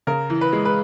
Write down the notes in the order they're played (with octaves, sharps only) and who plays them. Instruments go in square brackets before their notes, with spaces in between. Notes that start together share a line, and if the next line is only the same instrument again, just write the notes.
[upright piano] C#3 A#4
E3
B4
G#3
B4